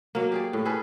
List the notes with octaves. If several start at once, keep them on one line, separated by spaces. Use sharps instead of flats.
F#3 A#3
G4 G#4 D5
A2
C#4 G#4 A4 B4